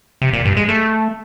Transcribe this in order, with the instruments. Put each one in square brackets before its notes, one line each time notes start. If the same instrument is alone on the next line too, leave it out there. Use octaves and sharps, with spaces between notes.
[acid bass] C3
A#2
G2
G#3
A3